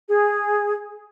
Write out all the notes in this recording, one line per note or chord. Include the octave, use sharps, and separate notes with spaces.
G#4